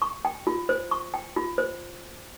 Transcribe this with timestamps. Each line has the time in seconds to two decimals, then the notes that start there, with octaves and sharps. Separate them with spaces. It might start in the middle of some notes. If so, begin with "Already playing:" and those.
0.02 C#6
0.25 G5
0.47 F4
0.69 C5
0.91 C#6
1.14 G5
1.36 F4
1.58 C5